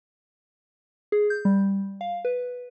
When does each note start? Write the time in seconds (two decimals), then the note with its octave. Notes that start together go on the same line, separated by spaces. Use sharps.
1.12 G#4
1.30 G6
1.45 G3
2.01 F5
2.25 B4